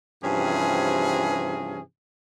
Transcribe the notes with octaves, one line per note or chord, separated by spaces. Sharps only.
G2 C3 E3 F3 C#4 G#4